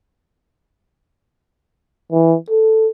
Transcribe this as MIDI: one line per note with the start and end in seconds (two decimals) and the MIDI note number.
2.12 2.36 52
2.50 2.88 69